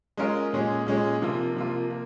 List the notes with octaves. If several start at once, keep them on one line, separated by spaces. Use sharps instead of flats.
G#3 C#4 F4 A#4
A#2 G#3 C#4 G#4
A#2 G#3 C#4 G#4
C3 F3 A#3 F4
C3 F3 A#3 F4
A#3